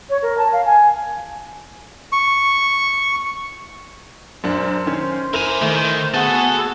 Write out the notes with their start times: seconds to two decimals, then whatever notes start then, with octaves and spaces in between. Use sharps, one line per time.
0.09 C#5
0.22 A#4
0.38 A5
0.52 F5
0.65 G#5
2.12 C#6
4.44 F#2 D4 C5
4.86 D#3 C#4
5.33 E4 A#4 G#5 F7
5.62 D#3 A3
6.14 B3 F#4 G#4 A4 F#5